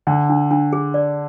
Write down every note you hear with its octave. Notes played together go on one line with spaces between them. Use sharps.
D3 D4
D4
D4
G#4
D5